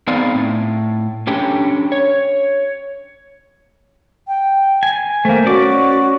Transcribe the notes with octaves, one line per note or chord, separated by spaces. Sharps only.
B3 C4 D#4 G#4 D5 F5
A2
C#4 D4 G4 A4 G5
C#5
G5
G#5
A3 A#3 C5
C#4 F#4 D5 D6